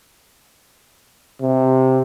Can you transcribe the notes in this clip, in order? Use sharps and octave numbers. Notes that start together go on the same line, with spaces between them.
C3